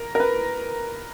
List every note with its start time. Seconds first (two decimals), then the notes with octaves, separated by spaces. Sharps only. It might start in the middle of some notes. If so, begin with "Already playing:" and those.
Already playing: A#4
0.15 A#4
0.20 B4